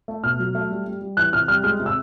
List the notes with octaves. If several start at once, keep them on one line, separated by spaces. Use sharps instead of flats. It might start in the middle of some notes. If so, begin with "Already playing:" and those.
A3
B2 F6
F#3
A3
G3
G3
G3
E3 F#6
C3 F6
G3 F6
G#3 F6
C3
E6